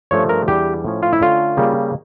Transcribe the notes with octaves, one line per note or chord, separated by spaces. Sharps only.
G2 F3 A3 C#4 C#5
A#4
E2 E3 G3 D4 G4
A2 F3 C#4
F4
E4
D3 A3 C#4 F4
C#3 G3 A#3